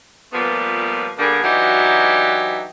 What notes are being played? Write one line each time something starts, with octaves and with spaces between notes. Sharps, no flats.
A#2 F3 G3 A3 B3
D3 G3 A#3 B3 D4 G#4
E3 F#3 D4 D#4 F#4 G4